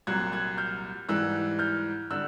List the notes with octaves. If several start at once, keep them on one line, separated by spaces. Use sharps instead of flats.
C2 A#2 F#3 F#6 G#6
F#6 G#6
F6 G6
G#2 E3 G3 E6 F#6
F6 G6
D3 G3 E6 F#6